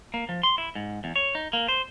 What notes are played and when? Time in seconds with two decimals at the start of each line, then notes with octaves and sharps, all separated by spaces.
0.14 A#3
0.29 F3
0.43 C6
0.58 E4
0.75 G#2
1.04 E2
1.16 C#5
1.35 D#4
1.53 A#3
1.68 C5